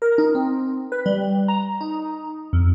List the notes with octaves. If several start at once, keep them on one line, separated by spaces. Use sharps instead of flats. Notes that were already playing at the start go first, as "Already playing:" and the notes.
A#4
D#4
C4
B4
G3
A#5
D#4
F2